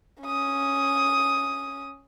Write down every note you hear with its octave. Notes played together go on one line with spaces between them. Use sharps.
C#4 D#6